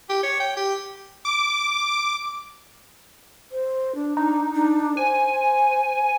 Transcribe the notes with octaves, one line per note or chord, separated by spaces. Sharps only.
G4
C#5
G5
G4
D6
C5
D4
D4 D#4
D4
C5 G#5